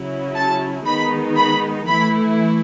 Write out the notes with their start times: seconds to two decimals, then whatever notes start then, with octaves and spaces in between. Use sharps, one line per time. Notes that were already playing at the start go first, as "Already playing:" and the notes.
Already playing: C#3 F#3 C#4 E4
0.35 A5
0.86 D#3 G#3 B3 D#4 B5
1.36 B5
1.87 E3 A3 E4 B5